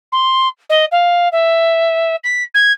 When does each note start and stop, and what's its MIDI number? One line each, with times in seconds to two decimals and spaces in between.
0.12 0.49 84
0.70 0.85 75
0.92 1.29 77
1.32 2.16 76
2.24 2.43 95
2.55 2.73 92